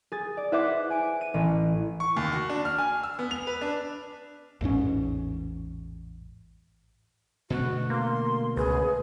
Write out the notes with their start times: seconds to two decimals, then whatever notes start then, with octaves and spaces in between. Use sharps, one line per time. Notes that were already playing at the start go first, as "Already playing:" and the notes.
0.12 G#4 A6
0.37 D5
0.52 E4 B4 C5 E5 F#5 D6
0.90 G#5 D7
1.21 D#7
1.34 A1
2.00 C#6
2.16 D#2
2.32 F#4
2.50 D4
2.65 F6
2.78 G#5
3.03 E6
3.19 B3
3.31 F7
3.47 B4
3.61 D4
4.61 A1 E2 G#2 C#4
7.50 B2 D3 A3 F#4
7.90 A#3 C6
8.57 C#2 G#4 B4